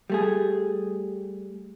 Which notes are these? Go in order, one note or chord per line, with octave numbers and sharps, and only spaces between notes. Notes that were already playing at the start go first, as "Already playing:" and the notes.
G3 A3 G#4